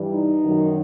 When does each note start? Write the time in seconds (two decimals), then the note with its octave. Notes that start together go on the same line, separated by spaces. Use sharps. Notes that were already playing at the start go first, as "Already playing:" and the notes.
Already playing: G2 E3 G3
0.12 D#4
0.44 F#2 D#3 F#3